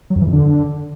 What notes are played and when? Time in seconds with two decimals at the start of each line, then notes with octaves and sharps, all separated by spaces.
0.10 F#3
0.16 F2
0.21 E3
0.27 F2
0.33 D3